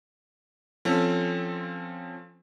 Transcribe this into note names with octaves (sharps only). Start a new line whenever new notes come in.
F3 C4 C#4 A4